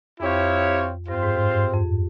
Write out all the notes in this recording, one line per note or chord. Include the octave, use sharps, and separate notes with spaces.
F2 C4 E4 G4 C#5 F5
G2 C4 F4 C5
G#2
G#2
G2
F2